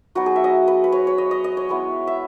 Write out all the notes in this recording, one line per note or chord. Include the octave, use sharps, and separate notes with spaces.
F#3 B3 D#4 F#4
G#4
E5
D#5
B4
B4
C#5
C#5
D#5
D#5
D#5
C#5
G#3 B3 E4
E5